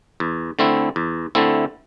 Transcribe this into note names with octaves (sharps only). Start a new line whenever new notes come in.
E2
D3 A3 C4 E4
E2
D3 A3 C4 E4